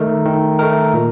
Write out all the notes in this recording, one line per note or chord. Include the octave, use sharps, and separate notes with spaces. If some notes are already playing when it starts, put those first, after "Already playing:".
Already playing: D#3 A3 D#4 A#4
D#3
A3 D#4 A#4
A#2